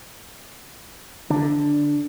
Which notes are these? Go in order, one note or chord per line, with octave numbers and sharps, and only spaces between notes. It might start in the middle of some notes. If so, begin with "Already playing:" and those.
D3 D4